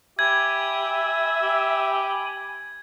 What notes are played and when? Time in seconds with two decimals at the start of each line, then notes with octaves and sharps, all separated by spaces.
0.19 G4 E5 G#5 B5 G#6
1.42 G4